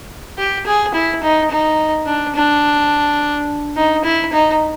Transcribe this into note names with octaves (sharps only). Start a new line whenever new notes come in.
G4
G#4
E4
D#4
D#4
D4
D4
D#4
E4
D#4